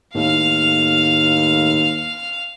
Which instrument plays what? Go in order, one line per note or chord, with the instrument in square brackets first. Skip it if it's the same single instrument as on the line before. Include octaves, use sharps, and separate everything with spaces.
[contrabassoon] D#2 [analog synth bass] A2 [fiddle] F5 F6